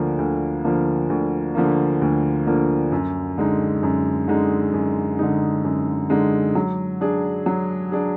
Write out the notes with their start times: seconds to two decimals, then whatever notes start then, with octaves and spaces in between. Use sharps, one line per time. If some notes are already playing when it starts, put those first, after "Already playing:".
Already playing: D2 D3 F3 A#3
0.19 D2
0.64 D3 F3 A#3
1.10 D2
1.55 D3 F3 A#3
2.01 D2
2.47 D3 F3 A#3
2.92 F#2
3.38 D3 G#3 D#4
3.83 F#2
4.28 D3 G#3 D#4
4.74 F#2
5.19 D3 G#3 D#4
5.64 F#2
6.10 D3 G#3 D#4
6.55 F#3
7.01 D4 G#4
7.46 F#3
7.92 D4 G#4